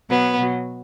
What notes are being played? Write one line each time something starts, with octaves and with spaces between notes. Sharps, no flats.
B2 F#3 B3
B2 F#3